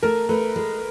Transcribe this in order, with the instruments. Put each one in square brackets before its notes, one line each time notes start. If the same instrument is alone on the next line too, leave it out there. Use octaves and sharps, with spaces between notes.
[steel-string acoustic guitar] A3 [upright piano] A#4
[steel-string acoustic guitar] A3 [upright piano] B4
[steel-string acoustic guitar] G#3